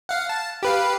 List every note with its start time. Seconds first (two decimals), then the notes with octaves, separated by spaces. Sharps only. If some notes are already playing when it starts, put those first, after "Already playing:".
0.09 F5 F#5
0.29 A5
0.63 G4 B4 F5